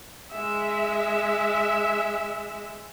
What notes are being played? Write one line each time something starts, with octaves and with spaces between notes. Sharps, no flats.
G#3 E5